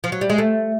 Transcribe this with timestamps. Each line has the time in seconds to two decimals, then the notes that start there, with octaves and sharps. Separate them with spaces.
0.04 F3
0.12 F#3
0.21 G3
0.30 G#3
0.38 A3